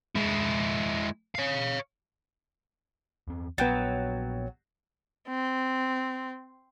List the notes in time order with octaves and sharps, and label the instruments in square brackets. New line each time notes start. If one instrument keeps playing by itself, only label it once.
[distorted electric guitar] G#3 E4
C#5 F5
[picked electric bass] E2 C4
[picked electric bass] A#1 [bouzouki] F#3 [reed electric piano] B3 G5 A6
[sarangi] C4